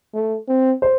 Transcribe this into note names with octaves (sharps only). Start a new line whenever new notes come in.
A3
C4
C5